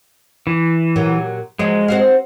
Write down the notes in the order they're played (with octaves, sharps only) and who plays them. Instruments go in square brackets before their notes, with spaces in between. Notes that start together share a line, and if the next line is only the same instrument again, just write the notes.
[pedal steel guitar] E3
[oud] A#2 F#3 G4
[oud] F3 F#3 [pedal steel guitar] G#3
[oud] C4 F#4 F5